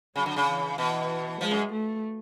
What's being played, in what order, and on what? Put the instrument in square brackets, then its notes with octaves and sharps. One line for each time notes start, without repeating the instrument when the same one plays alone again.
[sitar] C#3 [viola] F#3
[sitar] D3
C#3
[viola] E3
[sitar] B2 [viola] E3
[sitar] F3 [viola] G#3
[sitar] F#2
[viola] A3